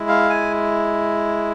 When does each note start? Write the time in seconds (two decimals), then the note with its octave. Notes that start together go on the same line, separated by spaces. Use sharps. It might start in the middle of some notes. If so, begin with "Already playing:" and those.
Already playing: G#3 E4
0.08 F5
0.30 G#5